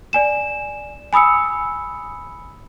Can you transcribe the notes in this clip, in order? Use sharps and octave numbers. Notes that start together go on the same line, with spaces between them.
D5 G#5 E7
G#5 B5 D#6 E6 C#7